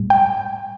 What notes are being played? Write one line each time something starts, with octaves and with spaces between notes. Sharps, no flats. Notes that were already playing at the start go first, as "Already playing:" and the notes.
Already playing: A2 G3
G5